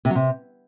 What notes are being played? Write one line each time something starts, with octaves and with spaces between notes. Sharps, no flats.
C3
F#3
C3